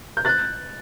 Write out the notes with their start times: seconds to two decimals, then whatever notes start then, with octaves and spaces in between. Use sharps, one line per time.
0.17 G6
0.25 F#6 A6